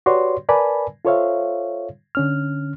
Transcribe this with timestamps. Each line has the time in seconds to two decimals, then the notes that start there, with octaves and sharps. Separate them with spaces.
0.06 F#4 G4 B4 C#5 D5 C6
0.49 A#4 B4 D5 G#5 A5 B5
1.05 F4 A4 C5 C#5 E5 F5
2.15 D3 C#4 F6